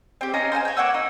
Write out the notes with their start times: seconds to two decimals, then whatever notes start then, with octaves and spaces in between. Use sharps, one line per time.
0.21 C4 G4
0.34 C#4 D#4 F5 A#5
0.52 C5 F5 F#5 G#5
0.65 C#5 G5
0.77 A#3 C#5 F#5 E6
0.94 D#4